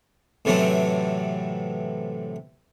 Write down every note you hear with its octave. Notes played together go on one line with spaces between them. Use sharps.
A2 C3 E3 F#3 A3 C4